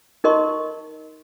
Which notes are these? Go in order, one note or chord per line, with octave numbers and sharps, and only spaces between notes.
D#4 A#4 D#5 C6 C#6